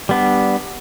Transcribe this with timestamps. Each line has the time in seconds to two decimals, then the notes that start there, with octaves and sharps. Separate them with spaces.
0.09 G3 B3 D4